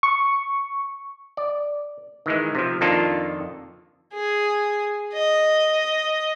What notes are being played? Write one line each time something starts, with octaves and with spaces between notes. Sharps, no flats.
C#6
D5
D#3 E3 G#3
C3 F3
F2 D#3 A#3 D4 F4 A4
G#4
D#5